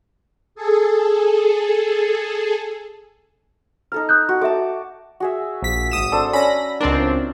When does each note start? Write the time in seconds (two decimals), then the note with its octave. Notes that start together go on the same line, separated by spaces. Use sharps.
0.55 G#4 A4
3.92 D#4 A4 A#5 F6
4.09 D#6 F#6 G6
4.29 F#4
4.41 A4 E5 A5 D6
5.20 F#4 G#4 E5
5.62 A#1 B6
5.91 G#1 D#6 E7
6.12 D4 A4 C5
6.33 C#4 A#5 B5 A#6
6.81 C#2 C4 D4 A#4